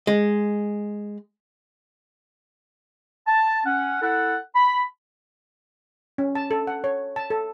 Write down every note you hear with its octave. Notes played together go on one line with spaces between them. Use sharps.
G#3
A5
C#4 F#5
E4 A4 F#5
B5
C#4
A5
A4
F#5
C#5
A5
A4